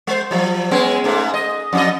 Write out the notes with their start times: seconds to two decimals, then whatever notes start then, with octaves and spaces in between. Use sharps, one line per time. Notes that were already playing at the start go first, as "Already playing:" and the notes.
0.07 G#3 C5
0.31 F3 F#3
0.71 G#3 B3 C#4
1.04 G#2 A3
1.34 D#5
1.73 F2 E4 D#5